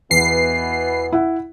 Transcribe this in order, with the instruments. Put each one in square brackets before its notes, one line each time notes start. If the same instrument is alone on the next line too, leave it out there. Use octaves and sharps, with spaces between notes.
[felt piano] E2 [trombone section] B2 E3 B3 [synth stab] C7
[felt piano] E4 E5 F#5